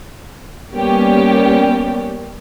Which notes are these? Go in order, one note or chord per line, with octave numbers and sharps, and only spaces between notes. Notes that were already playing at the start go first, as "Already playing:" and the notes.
G3 A#3 B3 C#4 G4 D5